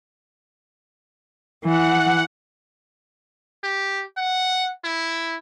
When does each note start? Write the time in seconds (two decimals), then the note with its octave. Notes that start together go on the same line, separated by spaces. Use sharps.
1.65 E3 F#5
3.63 G4
4.18 F#5
4.84 E4